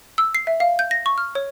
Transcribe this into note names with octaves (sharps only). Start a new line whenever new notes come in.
E6
C7
E5
F5
G6
A#6
C#6
F6
C#5